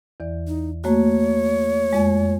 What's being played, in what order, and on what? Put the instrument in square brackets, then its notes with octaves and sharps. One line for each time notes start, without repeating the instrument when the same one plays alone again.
[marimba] E2 E3 D5
[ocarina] D#4
[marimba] A3 A#3 F#4 [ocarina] C#5
[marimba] F2 G#3